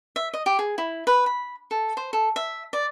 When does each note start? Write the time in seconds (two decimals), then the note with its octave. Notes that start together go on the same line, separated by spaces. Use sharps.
0.16 E5
0.34 D#5
0.46 G4
0.59 G#4
0.78 E4
1.07 B4
1.26 B5
1.71 A4
1.97 C5
2.13 A4
2.36 E5
2.73 D5